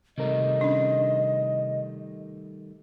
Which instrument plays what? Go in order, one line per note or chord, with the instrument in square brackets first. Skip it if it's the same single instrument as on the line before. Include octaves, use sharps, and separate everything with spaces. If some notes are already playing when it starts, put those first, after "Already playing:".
[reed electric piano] C3 A#4 [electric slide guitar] D#3 G3 A3 [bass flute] D#5
[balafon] C#4 D4